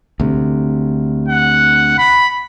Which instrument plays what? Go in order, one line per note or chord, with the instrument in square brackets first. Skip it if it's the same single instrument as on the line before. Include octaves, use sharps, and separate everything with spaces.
[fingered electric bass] D2 C3
[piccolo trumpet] F#5
B5